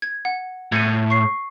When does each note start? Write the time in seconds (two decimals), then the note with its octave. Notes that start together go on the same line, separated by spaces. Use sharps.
0.02 G#6
0.25 F#5
0.72 A2 G#6 C#7 D#7
1.10 C#6 C7